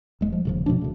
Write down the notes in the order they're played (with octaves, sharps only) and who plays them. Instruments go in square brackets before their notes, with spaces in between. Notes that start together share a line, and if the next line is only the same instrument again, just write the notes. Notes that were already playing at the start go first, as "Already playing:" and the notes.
[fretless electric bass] D#1 G#3
F3
D#1 C#3 F3
B2 F3 A3 D4
D2 C#3